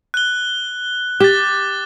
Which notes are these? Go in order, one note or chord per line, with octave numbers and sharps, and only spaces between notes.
F#6 G7
G4 D6 F#6 A6